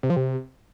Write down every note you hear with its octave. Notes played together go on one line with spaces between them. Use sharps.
C3
F3
C3